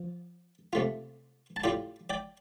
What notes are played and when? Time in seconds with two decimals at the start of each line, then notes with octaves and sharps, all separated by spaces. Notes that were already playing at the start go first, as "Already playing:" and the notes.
Already playing: F3
0.73 C3 A3 F4
1.56 A5
1.64 A2 G3 F4 D5 G5
2.10 D5 G5